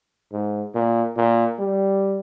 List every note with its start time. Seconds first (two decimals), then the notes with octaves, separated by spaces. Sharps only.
0.32 G#2
0.75 A#2
1.16 A#2
1.59 G3